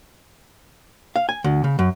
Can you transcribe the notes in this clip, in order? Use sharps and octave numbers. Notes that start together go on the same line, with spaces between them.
F5
G#5
D2
C#3
F#2